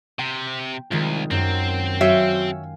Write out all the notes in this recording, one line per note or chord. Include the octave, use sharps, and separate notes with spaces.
C3 G5
C2 D#3 G#3 F4
F#2 C4
F#3 C#5 E5 F5 G5 G#5